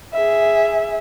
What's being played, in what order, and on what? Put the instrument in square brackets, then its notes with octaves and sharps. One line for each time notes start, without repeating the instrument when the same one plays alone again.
[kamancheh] G#4 E5